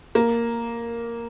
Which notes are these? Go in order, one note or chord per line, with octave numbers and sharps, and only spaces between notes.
A#3